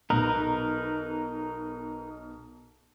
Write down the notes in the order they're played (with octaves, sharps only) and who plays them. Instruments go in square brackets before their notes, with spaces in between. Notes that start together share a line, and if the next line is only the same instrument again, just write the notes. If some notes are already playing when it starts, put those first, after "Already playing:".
[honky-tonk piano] B1 A#5 [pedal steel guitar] D#4 A#4 B4